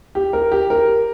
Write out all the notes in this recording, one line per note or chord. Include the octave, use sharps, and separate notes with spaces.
G4
A#4
G4
A#4